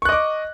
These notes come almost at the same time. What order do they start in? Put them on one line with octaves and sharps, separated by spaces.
C#6 F#6 D#5 D6